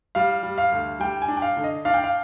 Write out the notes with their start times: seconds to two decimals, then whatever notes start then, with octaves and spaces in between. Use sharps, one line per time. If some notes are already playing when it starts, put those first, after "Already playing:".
0.15 G3 F5
0.43 G3
0.58 F5
0.72 D2
1.00 G3 G5
1.22 G#5
1.28 D4
1.37 G5
1.42 F5
1.57 D3
1.64 D#5
1.85 D4 F5
1.94 G5
2.04 F5